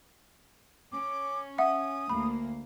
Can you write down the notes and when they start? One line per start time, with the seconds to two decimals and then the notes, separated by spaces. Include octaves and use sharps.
0.92 C#4 D6
1.58 E5 F#5 D#6
2.09 D2 A#3 B5